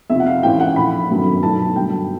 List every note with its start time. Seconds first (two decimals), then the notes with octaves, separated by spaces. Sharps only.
0.10 F2 C3 F3 E5
0.20 F#5
0.26 F5
0.43 A1 G#2 E3 G5
0.60 F#5
0.76 A#1 A2 F3 B5
1.10 G1 F#2 D#3 F#3 A3
1.43 B1 A2 F#3 A3 A5
1.76 G1 G2 D3 F#3 G5